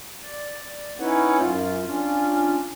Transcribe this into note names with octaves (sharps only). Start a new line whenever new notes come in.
D5
C#4 D#4 E4 B4 C#5 F#5
F#2 F4
C#4 D4 F4